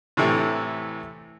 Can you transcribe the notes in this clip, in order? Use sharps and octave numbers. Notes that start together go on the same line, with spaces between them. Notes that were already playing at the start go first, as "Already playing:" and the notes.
A2 C3 E3 A3